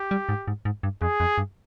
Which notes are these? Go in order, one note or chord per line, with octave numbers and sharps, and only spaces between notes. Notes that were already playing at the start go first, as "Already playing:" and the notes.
Already playing: G4
G3
G#2
G#2
G#2
G2
F2 G#4
F2
G2